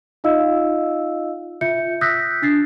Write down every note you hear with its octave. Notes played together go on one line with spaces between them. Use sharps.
D#4 F4 D#5 F5 E6
F4 E5 G6 C#7
D#6 E6 F#6 G6 A#6 B6
D4 A6 C7